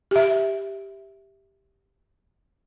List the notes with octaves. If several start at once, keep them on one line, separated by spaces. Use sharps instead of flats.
G4 E5